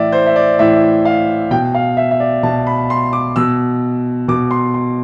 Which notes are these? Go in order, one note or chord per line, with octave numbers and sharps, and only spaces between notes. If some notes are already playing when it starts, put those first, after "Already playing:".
Already playing: A2 E3 D5 E5
C5
E5
D5
A2 E3 E5
F5
B2 G5
F5
E5
E5
D5
B2 A5
B5
C6
D6
B2 E6
B2 D6
C6
C6